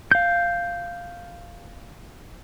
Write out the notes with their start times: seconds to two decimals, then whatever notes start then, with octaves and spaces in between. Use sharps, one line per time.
0.11 F5 G6